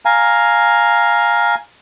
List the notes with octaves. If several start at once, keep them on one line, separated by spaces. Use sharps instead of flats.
F5 G#5 A#5